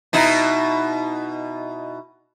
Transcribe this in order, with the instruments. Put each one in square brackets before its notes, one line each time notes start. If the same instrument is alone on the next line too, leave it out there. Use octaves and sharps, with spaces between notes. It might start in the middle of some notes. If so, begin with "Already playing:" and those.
[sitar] B2 D#4 E4